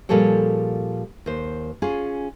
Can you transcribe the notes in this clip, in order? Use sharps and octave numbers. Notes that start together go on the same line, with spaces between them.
A#2 F3 G3 G#4 A4 C#5
D#2 C5
C#4 F4 G#4